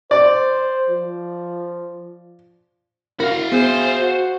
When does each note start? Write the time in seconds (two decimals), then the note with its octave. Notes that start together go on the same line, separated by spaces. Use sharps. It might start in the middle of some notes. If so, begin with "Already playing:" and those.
0.11 C5 D5
0.90 F3
3.20 E4 F#4 A#4 F5 F#5
3.52 B3 G#4 C5
4.00 F#4